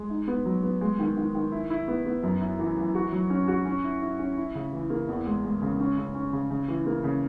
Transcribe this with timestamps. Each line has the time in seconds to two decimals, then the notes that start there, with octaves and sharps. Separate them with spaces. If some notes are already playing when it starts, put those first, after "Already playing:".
Already playing: G#3
0.10 D#4
0.28 B3
0.45 F#3
0.63 B3
0.81 G#3
0.99 D#3
1.17 D#3
1.35 D#3
1.52 E4
1.70 E4
1.88 B3
2.06 B3
2.23 F#2
2.41 E4
2.59 E3
2.77 E3
2.95 F#4
3.12 F#3
3.30 C#4
3.48 F#4
3.65 C#4
3.84 E4
4.01 E4
4.19 C#4
4.37 E4
4.55 C#3
4.73 E3
4.90 A#3
5.08 E2
5.26 G#3
5.44 G#3
5.62 C#3
5.80 C#4
5.97 C#3
6.15 C#4
6.33 C#3
6.50 C#3
6.68 E3
6.86 A#3
7.04 C#3